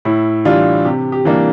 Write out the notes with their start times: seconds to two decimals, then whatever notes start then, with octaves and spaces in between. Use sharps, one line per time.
0.05 A2 E4
0.45 E3 G3 D4 F4
0.85 C3 G4
1.12 G4
1.25 E3 G3 A#3 D4